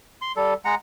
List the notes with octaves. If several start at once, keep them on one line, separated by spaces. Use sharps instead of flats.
C6
G3 A4
G#3 F#5 A#5